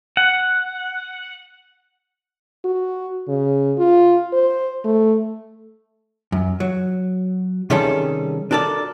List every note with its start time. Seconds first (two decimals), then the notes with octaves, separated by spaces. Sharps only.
0.17 F#5
2.65 F#4
3.28 C#3
3.78 F4
4.33 C5
4.85 A3
6.32 F#2
6.60 F#3
7.70 C3 D#3 G3 C#4 G#4 A4
8.51 D4 F#4 A4 A#4 D5